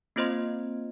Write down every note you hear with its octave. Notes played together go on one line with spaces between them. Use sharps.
A#3 C4 F4 C5 D#5 C6